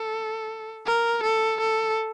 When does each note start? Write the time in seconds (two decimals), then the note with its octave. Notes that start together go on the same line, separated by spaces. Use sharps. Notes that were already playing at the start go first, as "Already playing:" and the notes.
Already playing: A4
0.86 A#4
1.23 A4
1.60 A4